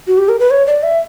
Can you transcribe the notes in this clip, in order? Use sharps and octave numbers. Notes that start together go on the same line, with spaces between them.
F#4
G4
A#4
B4
C#5
D5
E5